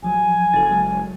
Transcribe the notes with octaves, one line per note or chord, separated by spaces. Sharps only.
A1 F3 F#3 G#5
F#1 A4 A6
F#3 G#3